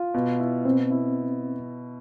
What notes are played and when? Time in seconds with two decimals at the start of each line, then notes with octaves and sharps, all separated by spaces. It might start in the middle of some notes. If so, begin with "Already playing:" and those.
Already playing: F4
0.14 B2
0.40 E4
0.65 B2 C4
0.90 E4